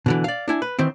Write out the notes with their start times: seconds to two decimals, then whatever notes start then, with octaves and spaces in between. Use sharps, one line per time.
0.06 B2 D3 E3
0.24 D5 F5
0.48 D4 E4 G#5
0.62 B4
0.79 D#3 E3 C4